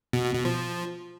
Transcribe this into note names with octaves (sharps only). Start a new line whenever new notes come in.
B2
B2
B2
F3